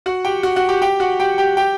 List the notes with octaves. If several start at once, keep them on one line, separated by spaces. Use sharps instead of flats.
F#4 F#5
G4 G5
F#4 F#5
F#4 F#5
G4 G5
G4 G5
F#4 F#5
G4 G5
G4 G5
G4 G5